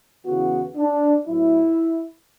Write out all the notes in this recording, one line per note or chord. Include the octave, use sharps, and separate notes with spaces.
E2 C#3 E3 B3 F#4
D4
A2 F#3 B3 E4